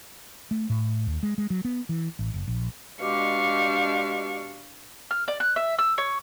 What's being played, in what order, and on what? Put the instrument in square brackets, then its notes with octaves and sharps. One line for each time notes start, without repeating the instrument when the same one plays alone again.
[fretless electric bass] A3
A2
D#2
G#3
G#3
F#3
B3
E3
A1
F#1
A#1
[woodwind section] B2 G#3 G4 [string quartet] D4 F5 C#6
[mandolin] F6
D5
F#6
E5
E6
C#5